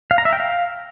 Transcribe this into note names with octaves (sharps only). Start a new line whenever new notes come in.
F5
A#5
E5
G5
F5